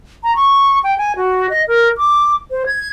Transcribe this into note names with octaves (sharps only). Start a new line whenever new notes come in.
A#5
C#6
G5
G#5
F#4
D#5
A#4
D6
C5
G#6